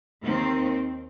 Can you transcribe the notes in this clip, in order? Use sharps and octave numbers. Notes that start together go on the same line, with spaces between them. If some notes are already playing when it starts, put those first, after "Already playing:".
D#2 D#3 C4